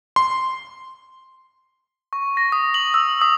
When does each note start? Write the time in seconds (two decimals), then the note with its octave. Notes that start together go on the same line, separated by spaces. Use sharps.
0.16 C6
2.13 C#6
2.37 A#6
2.52 D#6
2.74 F#7
2.94 E6
3.22 D#6